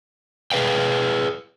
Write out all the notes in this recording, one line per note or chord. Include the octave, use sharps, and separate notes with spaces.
G#4 A4 B4 F5 G5